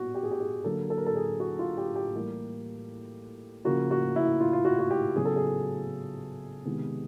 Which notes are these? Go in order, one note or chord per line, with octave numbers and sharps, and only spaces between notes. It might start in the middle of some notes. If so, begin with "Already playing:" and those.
Already playing: A#2 G3 B3 F#4
G4
G#4
G4
G#4
D3 F#3 A#3 A4
A4
A#4
A4
G#4
F#4
F4
G4
G4
A2 E3 G3 A#3
C#3 F3 A#3 F#4
F#4
E4
F4
F4
F#4
F#4
G4
C#3 F#3 B3 G#4
A4
G#4
C3 D#3 G#3 B3